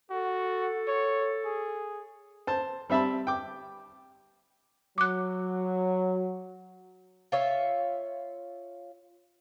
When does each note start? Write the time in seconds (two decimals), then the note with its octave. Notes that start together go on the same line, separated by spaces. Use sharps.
0.10 F#4 A4
0.88 C#5
1.45 G#4
2.47 C5 A5
2.90 G3 C4 E5 A5 B5
3.27 G5 D6
4.98 F#3 D6 F#6
7.32 F4 C#5 E5